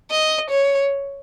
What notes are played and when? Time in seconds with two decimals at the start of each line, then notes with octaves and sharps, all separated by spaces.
0.11 D#5
0.50 C#5